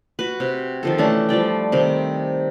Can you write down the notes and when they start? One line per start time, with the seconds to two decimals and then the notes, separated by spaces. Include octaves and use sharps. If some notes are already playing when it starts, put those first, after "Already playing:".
0.19 F#4 B4
0.40 C3
0.83 D#3 F3 A4
0.98 E3 A3 C#4 D4
1.29 F3 G3 D5 G5
1.72 C3 D#3 C4 D#4